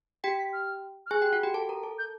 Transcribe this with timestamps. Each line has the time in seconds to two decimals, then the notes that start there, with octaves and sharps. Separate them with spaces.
0.24 G4 G5 B6
0.38 B6
0.53 F6
1.06 F6
1.10 G#4 G#5 F#6
1.22 G4 G5
1.33 F#4 F#5
1.43 G4 G5
1.54 A4 A5
1.69 A#4 A#5
1.83 A4 A5
1.98 G6